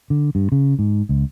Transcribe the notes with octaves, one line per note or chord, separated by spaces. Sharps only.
D3
G2
C#3
G#2
C#2